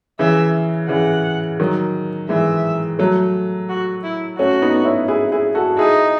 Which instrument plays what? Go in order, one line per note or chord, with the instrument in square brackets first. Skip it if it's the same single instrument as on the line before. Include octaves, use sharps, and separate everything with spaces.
[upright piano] C#3 E3 [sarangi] E5
[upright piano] C#3 E3 [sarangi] F#5
[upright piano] D#3 F#3
[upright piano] E3 G#3 [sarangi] E5
[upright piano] F#3 A3
[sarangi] F#4
E4
[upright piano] A3 C#4 [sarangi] F#4
[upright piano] B3 D#4
C#4 E4
E4 G#4
E4 G#4
F#4 A4
[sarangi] D#4 [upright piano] E4 G#4